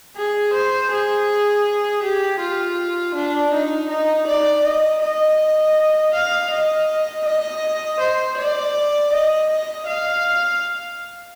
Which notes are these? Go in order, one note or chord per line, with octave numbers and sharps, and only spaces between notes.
G#4
C5
G#4
G4
F4
D4
D#4
D#4
D5
D#5
D#5
F5
D#5
D#5
C5
D5
D#5
D#5
F5